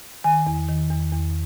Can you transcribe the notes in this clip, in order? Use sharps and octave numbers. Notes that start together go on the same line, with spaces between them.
D#3 G#5
E2
D#3
E2
E2